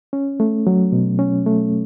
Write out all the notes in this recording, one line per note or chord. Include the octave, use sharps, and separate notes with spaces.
C#4
A3
F#3
B2
C#4
A3